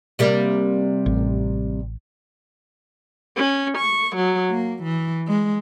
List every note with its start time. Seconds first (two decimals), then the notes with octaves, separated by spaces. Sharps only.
0.19 C3 G3 A#3
1.06 A1
3.36 C#4
3.77 C#6
4.16 F#3
4.52 A#3
4.83 E3
5.29 G#3